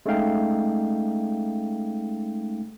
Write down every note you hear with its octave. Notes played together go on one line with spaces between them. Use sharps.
G#3 A3 C#4 D#4 F5 G5